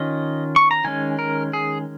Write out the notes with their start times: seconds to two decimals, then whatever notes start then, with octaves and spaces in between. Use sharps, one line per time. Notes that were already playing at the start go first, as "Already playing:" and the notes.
Already playing: D#3 C#4 F4 D#5
0.56 C#6
0.71 A#5
0.84 D#3 G#3 C#4 G#5
1.19 A#4
1.53 G#4